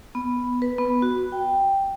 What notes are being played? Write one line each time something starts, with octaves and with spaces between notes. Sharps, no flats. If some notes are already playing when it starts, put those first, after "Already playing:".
B3
B4
B3
F#4
G5